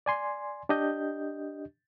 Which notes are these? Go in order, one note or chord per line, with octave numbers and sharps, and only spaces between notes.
D5 G#5 C6
D4 G4 D#5 G6